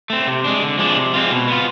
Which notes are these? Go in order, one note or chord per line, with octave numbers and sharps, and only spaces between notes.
A3 C4
C3
G#3 D4
D3
F3 G#3 D4
C3
G#3 C4 F4
B2
B3 F4